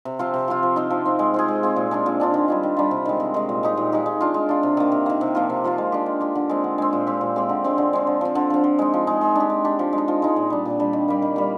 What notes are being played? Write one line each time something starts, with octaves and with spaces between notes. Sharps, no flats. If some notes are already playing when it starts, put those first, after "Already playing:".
C3
F3 C4 F4
C3
F3 C4 F4
F3
C4 D#4
F3
C4 D#4
G#3
C4 F4 G#4
G#3
C4 F4 G#4
A#2
G#3 D4 F4
A#2
G#3 D4 F4
D#3
G3 D4 F4
D#3
G3 D4 F4
C3
D#3 G#3
C3
D#3 G#3
A#2
G#3 D#4 G4
A#2
G#3 D#4 G4
G#3
D4 F4
G#3
D4 F4
C3
D#3 A#3
C3
D#3 A#3
C3
F3 A#3 F4
C3
F3 A#3 F4
G#3
D4 G4
G#3
D4 G4
D3
G#3 C4
D3
G#3 C4
A#2
G#3 C4 G4
A#2
G#3 C4 G4
D3
G#3 C4
D3
G#3 C4
D3
F3 C4
D3
F3 C4
F3
G#3 D#4
F3
G#3 D#4
G#3
D4 G4
G#3
D4 G4
F3
G#3
D#4
F3
G#3 D#4
A#2
G3 D4
A#2
G3 D4
D#3
G3 A#3
D#3
G3 A#3